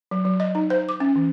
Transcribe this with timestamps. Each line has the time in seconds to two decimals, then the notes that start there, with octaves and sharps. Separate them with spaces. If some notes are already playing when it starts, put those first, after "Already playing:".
0.11 F#3
0.25 F#3
0.40 D#5
0.55 D#4
0.70 C5
0.89 D6
1.00 C#4
1.16 E3